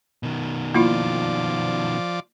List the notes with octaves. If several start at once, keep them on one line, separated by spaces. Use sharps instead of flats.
B2 D#3
F3 A#3 E4 F4 D5